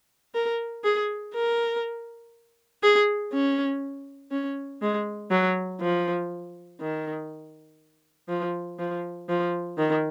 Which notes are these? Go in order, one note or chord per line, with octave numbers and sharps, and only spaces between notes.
A#4
G#4
A#4
G#4
C#4
C#4
G#3
F#3
F3
D#3
F3
F3
F3
D#3